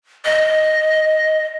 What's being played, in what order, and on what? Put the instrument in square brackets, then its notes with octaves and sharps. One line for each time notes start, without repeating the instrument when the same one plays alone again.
[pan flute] D#5